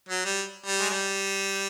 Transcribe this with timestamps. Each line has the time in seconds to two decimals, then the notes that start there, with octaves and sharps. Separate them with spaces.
0.09 F#3
0.25 G3
0.66 G3
0.80 G#3
0.90 G3